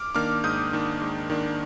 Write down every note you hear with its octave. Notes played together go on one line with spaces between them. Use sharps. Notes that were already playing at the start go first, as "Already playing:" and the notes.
Already playing: D6 F6
D#3 A#3 D4 D6 F6
G#2 D#6 G6
D#3 A#3 D4
G#2
D#3 A#3 D4